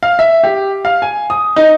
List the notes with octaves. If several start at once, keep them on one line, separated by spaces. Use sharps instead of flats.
F5
E5
G4
F5
G#5
D#6
D#4